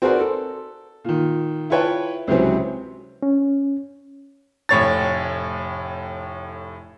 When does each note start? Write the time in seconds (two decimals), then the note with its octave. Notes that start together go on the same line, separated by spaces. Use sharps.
0.02 C4 F#4 G#4 A#4 B4 D5
0.20 A4
1.05 A#2 D#3
1.70 E4 F4 B4 C#5 G5 A5
2.27 C#2 C3 E3 F#3 C4
3.23 C#4
4.69 F1 A2 C#5 A6